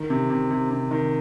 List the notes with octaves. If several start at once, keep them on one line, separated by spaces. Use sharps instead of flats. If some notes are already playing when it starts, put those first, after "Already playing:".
Already playing: D#3
C3
C3
C3
C3
D#3